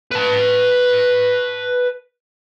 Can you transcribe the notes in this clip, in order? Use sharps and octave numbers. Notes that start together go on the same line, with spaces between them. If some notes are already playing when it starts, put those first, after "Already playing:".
B4 A5